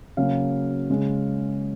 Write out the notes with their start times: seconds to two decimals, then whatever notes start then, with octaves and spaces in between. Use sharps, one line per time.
0.17 C#3 F#3 A#3 C#4 F5
0.90 C#3 G#3 C#4